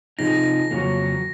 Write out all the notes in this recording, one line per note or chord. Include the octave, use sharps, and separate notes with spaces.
C3 F3 C4 D#4 G#4 A#6
F2 C#3 F#3 A#3 C#4